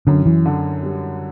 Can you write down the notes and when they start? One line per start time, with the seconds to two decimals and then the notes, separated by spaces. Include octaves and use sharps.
0.07 F#2 D3
0.26 E3
0.45 D3
0.83 G3